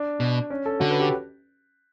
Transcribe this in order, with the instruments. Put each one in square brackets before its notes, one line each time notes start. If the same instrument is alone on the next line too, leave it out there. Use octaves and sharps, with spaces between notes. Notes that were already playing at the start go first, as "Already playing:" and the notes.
Already playing: [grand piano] D4
[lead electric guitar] B2
[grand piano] C#4
A4
[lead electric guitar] D3 [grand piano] F#4
[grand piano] B4
G4